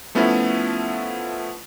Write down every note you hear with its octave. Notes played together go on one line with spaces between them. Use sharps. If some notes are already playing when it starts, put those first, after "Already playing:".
F3 A3 B3 C#4 E4 F4